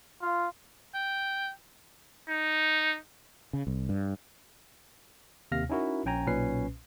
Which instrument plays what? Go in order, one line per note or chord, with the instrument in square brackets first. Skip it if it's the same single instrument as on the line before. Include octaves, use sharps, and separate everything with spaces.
[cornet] F4
[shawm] G5
[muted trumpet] D#4
[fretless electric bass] C#3
C2
G2
[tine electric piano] D#2 C3 F5 F6 A#6
C#4 D#4 E4 F#4 A#4
A#1 C#4 G5 G#5 A#5
B1 A#2 C#4 B4 C7